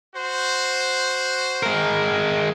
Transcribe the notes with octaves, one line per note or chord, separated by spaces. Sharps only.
F#4 C5
G#3 A#4